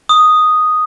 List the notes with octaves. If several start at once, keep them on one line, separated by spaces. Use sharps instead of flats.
D#6